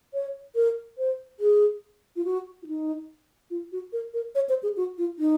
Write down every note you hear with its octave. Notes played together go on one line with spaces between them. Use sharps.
C#5
A#4
C5
G#4
F4
F#4
F4
D#4
F4
F#4
A#4
A#4
C#5
C5
G#4
F#4
F4
D#4